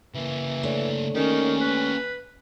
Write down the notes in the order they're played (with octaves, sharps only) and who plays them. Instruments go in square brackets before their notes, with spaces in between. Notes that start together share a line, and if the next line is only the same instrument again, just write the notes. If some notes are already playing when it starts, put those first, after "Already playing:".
[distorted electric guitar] C#3 A#3 [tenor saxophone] E3
[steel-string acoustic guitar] A3 D4 C#5
[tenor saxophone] D#3 [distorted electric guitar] A#3 G4 [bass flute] C#4
[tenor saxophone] B4